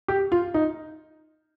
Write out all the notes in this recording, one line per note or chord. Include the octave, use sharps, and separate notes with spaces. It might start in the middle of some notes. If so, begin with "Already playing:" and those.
G4
F4
D#4